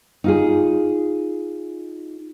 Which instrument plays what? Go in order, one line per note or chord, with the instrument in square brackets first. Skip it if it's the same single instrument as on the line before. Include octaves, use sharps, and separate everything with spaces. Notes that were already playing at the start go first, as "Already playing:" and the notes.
[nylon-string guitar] D#4 F4 G#4